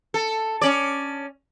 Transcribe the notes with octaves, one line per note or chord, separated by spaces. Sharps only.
A4
C#4 D5